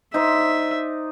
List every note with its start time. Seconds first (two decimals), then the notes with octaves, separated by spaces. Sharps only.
0.14 D#4 C5 D5 E5